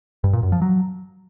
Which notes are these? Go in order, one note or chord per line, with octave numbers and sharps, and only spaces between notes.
G2
A#2
F#2
F3
F#3